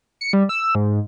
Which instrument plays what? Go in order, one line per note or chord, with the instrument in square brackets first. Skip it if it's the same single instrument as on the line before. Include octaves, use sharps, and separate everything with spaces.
[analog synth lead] C#7
G3
E6
G#2